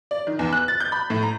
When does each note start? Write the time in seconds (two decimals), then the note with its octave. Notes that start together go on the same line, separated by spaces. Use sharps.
0.11 D5
0.27 D#3
0.39 E2
0.53 F#6
0.68 A6
0.80 G6
0.92 B5
1.10 A2
1.23 A#5